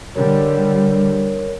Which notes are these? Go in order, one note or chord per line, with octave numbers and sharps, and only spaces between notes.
D3 G3 A#4 C#5